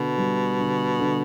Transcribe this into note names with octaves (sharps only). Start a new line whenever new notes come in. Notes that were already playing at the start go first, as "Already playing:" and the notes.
Already playing: B2 D3
G3
D3
D3